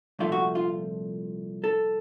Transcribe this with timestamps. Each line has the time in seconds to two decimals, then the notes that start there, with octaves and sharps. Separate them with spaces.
0.19 C2 A#2 F3 A3 F4
0.32 F#4
0.55 F4
1.64 A4